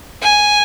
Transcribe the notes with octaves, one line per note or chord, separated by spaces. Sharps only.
G#5